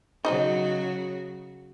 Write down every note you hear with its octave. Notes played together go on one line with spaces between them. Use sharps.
C#3 F#3 D#4 F#4 C5 D#5